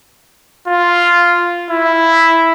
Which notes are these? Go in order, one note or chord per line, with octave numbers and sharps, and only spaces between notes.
F4
E4